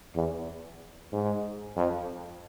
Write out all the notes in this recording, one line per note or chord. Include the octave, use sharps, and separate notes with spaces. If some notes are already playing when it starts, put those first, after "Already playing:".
E2
G#2
F2